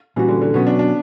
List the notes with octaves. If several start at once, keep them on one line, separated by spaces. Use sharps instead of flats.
A#2 E3 G3 C#4 F#4
D3
D3
B2 F#3 B3 C#4 F#4
D4
D4